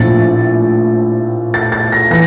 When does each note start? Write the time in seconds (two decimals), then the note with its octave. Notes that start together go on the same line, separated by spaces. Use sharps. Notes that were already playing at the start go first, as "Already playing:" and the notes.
Already playing: A#1 A2 F3 A6
1.54 A6
1.72 A6
1.92 A#6
2.10 E3 A#6